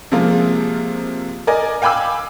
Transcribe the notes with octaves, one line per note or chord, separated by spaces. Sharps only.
C3 F3 G#3 A#3 F4
A#4 D5 D#5 G#5
F5 G5 G#5 B5 D6 E6